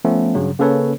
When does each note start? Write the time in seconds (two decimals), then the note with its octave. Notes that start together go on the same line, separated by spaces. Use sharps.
0.05 F3 A3 B3 C#4
0.35 G2 C#3 F#3
0.59 C#3 A#3 C#4 A4 B4 C#5